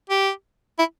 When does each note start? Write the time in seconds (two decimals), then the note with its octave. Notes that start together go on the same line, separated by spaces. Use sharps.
0.10 G4
0.79 E4